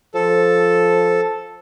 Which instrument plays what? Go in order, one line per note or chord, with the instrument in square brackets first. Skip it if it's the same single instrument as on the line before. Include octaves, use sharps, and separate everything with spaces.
[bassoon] F3 [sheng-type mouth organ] A4